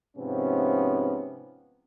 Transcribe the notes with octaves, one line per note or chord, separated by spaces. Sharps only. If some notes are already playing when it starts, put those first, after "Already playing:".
G#2 C3 F3 B3 C#4